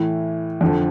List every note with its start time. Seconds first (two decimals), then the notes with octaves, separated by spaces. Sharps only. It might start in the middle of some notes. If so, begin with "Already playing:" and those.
Already playing: A2 E3
0.61 F2 D3 F3